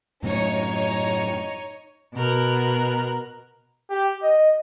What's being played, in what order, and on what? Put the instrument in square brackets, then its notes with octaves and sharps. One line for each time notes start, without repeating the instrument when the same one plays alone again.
[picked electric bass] F#2 A2 C#3 [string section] D#4 C#5
[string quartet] B2 A#4 F#6
[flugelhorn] G4
D#5